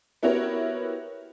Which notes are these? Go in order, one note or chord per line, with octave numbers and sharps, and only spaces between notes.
B3 E4 F#4 G4 A#4 C#5